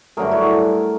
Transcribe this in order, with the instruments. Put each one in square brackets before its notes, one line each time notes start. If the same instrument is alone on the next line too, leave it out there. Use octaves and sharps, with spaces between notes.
[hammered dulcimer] G2 D3 F#3 A3 G#4 A#4
E4 F#4